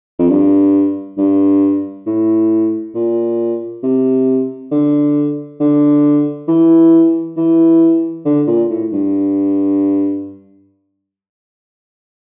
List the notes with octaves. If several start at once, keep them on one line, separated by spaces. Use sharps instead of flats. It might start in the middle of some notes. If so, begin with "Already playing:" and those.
F2
G2
G2
A2
A#2
C3
D3
D3
E3
E3
D3
A#2
A2
G2